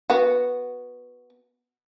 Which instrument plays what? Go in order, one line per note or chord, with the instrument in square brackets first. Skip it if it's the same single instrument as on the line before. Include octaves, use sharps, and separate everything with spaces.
[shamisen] B3 F#4